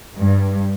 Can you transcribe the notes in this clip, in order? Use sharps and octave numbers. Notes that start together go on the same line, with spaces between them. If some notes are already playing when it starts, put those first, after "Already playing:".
G2